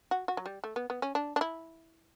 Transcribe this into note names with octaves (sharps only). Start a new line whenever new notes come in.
F#4
F#4
F#3
G3
A3
B3
B3
C#4
D4
D4
E4